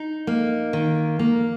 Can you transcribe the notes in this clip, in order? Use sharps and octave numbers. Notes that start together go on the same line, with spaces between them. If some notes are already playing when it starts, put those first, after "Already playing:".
Already playing: D#4
A#3
D#3
A#3